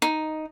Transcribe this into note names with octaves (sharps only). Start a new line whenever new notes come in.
D#4